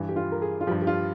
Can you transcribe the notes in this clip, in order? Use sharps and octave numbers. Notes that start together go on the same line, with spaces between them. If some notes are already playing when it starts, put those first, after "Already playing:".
Already playing: G2 E3
G4
F4
A#4
G#4
F4
G2 F3 G4
G4
F4